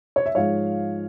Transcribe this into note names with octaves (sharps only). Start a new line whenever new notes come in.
C#5
E5
G#2 F3 G#3 C#5 F5